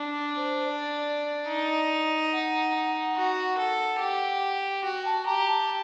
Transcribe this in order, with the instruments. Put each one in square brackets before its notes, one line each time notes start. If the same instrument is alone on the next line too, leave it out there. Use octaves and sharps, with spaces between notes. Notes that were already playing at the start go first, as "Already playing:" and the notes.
Already playing: [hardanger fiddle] D4
[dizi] C5
D5
[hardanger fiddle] D#4
[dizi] F#5
[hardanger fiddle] F#4
A4
G4
[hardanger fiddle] F#4 [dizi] G5
[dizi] A5
[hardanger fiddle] G4 [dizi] A#5
[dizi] A5